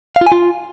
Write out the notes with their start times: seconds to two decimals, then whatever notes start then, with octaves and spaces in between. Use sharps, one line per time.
0.16 F5
0.21 F4
0.26 G#5
0.32 F4